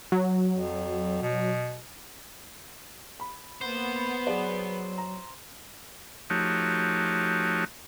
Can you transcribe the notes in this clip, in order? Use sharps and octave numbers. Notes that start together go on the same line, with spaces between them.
F#3
F2
B2
B5
A#3 B3 C5
F#3 G#4 D5
A#5
F3 A3 D#4 F#4 G4 C#5